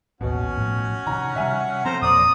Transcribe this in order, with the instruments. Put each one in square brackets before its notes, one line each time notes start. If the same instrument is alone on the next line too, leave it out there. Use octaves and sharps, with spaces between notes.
[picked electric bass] A1 D#2 [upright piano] B2 [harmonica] C#4 F#4
[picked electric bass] A2 F3
[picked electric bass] C3 D#3 [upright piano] A#5
[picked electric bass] C3 G3 [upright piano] E5 G#5 F6
[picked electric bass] F3 [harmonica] A3 C5 [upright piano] C4 [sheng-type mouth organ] A#5
[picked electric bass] E1 A#2 F3 [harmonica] D5 [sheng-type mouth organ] D#6